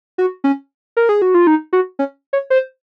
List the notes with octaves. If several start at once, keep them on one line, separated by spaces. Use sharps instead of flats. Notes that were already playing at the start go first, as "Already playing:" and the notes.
F#4
C#4
A#4
G#4
F#4
F4
D#4
F#4
C#4
C#5
C5